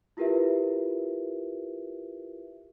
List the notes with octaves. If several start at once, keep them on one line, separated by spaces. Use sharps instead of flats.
E4 F4 G4 A#4 B4 E5